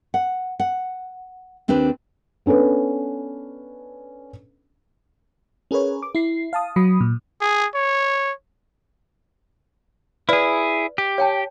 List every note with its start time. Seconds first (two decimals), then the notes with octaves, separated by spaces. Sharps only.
0.14 F#5
0.60 F#5
1.68 D#2 C4 D4 G4 B4
2.46 B3 C#4 D4 A4 B4
5.71 C#4 G#4 A#4 B4 C#5
6.03 D6
6.15 E4 C7
6.53 F5 A5 D#6
6.76 F#3 B5 D#6
7.01 A#2
7.41 G#4
7.74 C#5
10.29 E4 G#4 B4 D5
10.98 G4
11.18 C#5 G5 A5